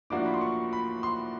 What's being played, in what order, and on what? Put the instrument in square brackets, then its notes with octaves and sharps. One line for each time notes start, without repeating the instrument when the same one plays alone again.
[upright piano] A2 F3 A#3 D4 F#4 [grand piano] D6
[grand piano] B5
C6
C#6
B5
C6